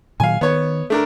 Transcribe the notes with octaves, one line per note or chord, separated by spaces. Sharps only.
A#2 D#3 F#3 F5 G#5
D#3 B3 C#5
A3 D4 A#4